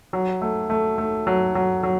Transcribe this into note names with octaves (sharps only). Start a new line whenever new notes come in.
F#3
A3
A3
A3
F#3
F#3
F#3